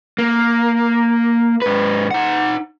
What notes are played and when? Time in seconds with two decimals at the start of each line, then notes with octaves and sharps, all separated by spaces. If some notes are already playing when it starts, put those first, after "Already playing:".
0.19 A#3
1.62 G#2 B4
2.11 D#4 F#5